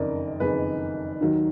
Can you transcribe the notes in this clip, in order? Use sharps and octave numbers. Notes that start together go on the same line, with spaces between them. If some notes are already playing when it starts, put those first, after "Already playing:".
Already playing: F#1 F2 D#3 A#4 D5 D#5
F#1 F2 D#3 G#4 B4
D#2 D#3 F#3